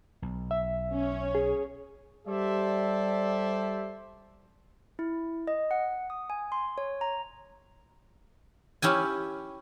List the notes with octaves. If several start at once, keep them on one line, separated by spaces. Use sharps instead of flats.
B1
E5
C#4 C#5
G#4
G3 G4 A4 C5 D5 E5
E4
D#5
F#5
D#6
G#5
C6
C#5
A#5
C#4 E4 G4 G#5